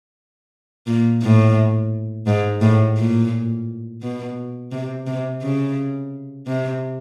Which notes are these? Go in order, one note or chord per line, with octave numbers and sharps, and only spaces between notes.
A#2
A2
G#2
A2
A#2
B2
C3
C3
C#3
C3